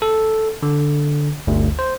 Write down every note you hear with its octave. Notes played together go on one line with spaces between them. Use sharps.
A4
D3
G1 D2
C5